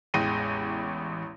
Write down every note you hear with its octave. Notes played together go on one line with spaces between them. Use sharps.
A1 E2 G#3 G5 A#6 D#7